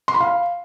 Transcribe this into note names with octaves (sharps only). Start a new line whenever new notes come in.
C6
B5
F5